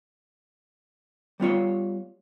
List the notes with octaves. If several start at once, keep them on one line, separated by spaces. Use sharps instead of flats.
G3 B3 F4 C#5